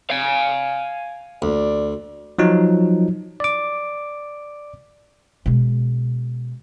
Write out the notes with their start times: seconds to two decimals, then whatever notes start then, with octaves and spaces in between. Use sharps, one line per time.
0.10 F5 G#5
1.42 D2 D5
2.39 F3 F#3 D#4
3.40 D5 D6
5.46 B2 G#3